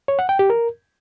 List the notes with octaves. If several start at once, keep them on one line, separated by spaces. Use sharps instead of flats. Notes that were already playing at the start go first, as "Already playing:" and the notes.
C#5
F#5
G5
G4
A#4